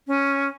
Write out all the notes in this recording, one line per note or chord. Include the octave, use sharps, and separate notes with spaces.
C#4